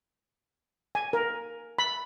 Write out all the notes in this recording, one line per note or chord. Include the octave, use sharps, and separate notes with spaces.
G#5
A#4
B5